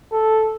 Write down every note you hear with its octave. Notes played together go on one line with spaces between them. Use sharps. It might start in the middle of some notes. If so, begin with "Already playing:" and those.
A4